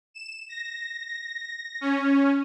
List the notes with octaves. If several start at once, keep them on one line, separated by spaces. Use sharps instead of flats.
E7
A#6
C#4